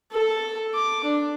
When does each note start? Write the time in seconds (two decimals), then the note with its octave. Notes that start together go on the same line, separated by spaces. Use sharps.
0.12 A4
0.75 D6
1.04 D4